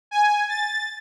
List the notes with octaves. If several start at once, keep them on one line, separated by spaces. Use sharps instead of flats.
G#5
A6